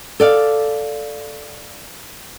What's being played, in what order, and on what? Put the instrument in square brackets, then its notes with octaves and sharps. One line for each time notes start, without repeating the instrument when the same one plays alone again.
[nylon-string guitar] A4 D5 F5